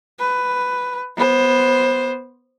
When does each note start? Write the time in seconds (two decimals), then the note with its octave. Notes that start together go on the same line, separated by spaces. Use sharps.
0.19 B4
1.17 B3 C5